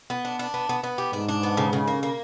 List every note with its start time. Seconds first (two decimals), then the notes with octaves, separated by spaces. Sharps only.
0.10 B3
0.25 D4
0.39 D4
0.54 B3
0.69 B3
0.83 B3
0.98 G4
1.13 G#2 D4
1.29 D4
1.43 B3
1.57 C#3
1.73 C#3
1.87 A#3
2.03 A#3